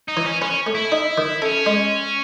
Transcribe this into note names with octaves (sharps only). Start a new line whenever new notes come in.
D#4
E3
C#4
C#4 B4
A3
E4
D#4
D#3
C#4 A4
G#3